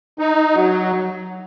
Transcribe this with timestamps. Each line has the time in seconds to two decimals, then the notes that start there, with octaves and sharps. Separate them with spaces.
0.19 D#4
0.55 F#3